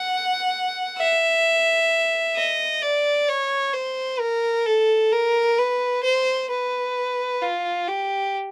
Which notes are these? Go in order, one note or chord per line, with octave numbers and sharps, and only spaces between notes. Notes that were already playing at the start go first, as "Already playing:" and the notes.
Already playing: F#5
E5
D#5
D5
C#5
C5
A#4
A4
A#4
B4
C5
B4
F4
G4